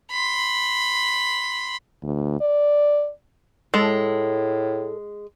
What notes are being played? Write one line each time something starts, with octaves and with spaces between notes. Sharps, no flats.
B5 C6
D2
D5
A2 G#3 A4